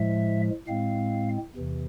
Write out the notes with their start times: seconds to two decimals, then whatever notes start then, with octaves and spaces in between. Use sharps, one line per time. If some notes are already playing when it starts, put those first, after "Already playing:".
Already playing: A2 F3 G#3 E5
0.67 A2 G#3 C4 F5
1.55 E2 C3 E3